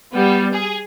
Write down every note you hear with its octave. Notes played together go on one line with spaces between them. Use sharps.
G3 B3
G#4